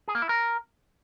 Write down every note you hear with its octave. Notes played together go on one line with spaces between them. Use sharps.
G#4
A#3
E4
A#4